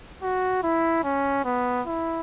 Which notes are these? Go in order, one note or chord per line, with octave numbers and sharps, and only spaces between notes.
F#4
E4
C#4
B3
E4